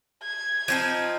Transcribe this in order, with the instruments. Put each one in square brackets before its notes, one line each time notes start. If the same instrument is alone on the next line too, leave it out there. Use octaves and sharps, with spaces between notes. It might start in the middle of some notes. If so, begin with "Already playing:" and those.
[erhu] G#6
[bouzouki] F3 C4 D#4